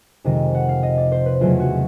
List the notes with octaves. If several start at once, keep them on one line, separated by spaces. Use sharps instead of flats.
F2 C3 D#3 G#3 D#5
F#5
F5
D#5
D5
C5
B4
E2 C#3 F#3 A3 F4
F#4